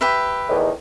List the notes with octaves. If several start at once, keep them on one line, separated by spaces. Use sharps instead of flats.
G4 B4 E5
E2 A2 D#3